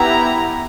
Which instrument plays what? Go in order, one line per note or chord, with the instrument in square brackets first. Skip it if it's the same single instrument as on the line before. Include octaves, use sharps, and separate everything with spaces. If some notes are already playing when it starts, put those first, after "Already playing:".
Already playing: [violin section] B3 E4 G4 A#5